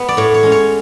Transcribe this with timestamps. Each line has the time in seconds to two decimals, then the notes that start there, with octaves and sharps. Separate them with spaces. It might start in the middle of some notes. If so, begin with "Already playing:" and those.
Already playing: B3 B4
0.08 D5
0.17 A2 C#5
0.34 C#5
0.43 G#3 C#4
0.52 C#5